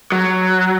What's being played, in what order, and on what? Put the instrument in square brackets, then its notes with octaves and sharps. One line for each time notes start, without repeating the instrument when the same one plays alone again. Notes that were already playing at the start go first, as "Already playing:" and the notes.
[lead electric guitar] F#3